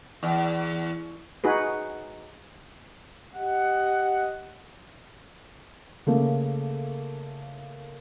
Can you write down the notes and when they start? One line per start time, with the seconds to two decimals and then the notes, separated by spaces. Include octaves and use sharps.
0.23 E2
1.44 D#4 F#4 G#4 B4
3.36 G4 D#5 F#5
6.07 C#3 A3 A#3